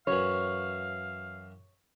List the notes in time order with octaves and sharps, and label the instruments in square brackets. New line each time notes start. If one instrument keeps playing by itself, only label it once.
[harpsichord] F#2 E3 [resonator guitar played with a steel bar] C#5 [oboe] F5